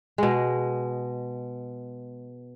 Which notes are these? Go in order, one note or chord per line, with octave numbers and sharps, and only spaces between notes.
B2 G#3